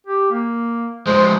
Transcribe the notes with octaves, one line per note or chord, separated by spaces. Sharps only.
G4
A#3
F3 G#3 C5